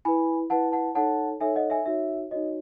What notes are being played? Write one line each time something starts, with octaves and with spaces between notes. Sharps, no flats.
E4 B4 G#5 B5
E4 B4 F#5 A5
F#5 A5
D#4 A4 C#5 F#5 A5
D#4 A4 C#5 E5 G#5
D#5 F#5
E5 G#5
D#4 F#4 C#5 E5
D#4 F#4 C#5 D#5